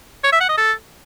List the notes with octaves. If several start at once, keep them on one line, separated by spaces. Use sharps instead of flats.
C#5
E5
F#5
D#5
A4